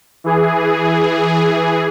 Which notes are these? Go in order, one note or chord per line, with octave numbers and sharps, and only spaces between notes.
E3 G#4